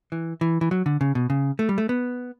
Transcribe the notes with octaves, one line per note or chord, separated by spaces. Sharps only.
E3
E3
E3
F#3
D3
C#3
B2
C#3
A3
G3
A3
B3